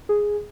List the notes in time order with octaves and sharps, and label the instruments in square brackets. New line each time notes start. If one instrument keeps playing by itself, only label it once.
[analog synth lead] G#4